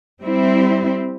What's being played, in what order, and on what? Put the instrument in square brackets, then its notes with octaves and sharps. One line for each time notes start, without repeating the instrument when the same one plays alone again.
[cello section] G3 C4 E4